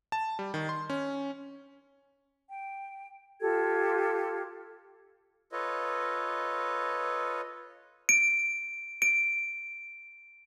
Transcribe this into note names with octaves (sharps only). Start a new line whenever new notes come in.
A5
G3
D#3
C6
C#4
G5
F4 G4 A4 G#6
F4 A4 B4 C#5 D#5
D7
D7